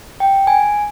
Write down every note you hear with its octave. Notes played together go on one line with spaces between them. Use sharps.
G5
G#5